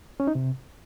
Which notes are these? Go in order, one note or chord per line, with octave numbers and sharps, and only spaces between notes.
C#4
D#4
C3